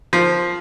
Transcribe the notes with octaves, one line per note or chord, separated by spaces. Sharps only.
F3